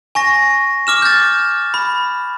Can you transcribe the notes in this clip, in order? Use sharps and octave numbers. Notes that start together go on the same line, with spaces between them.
G#5 C#6 A#6
D6 F6 E7
G6 A6
B5